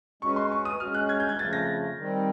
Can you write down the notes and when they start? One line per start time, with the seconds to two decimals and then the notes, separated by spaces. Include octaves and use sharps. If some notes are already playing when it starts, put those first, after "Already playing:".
0.22 G#3 C#4 F#4 B4 C#6
0.36 C6
0.52 C#6
0.65 D#6
0.80 G#3 C#4 F#4 F6
0.95 F#6
1.09 G#6
1.20 G6
1.29 G#6
1.39 F2 C#3 F3 A3 A6
1.53 A#6
1.97 D#3 G3 C4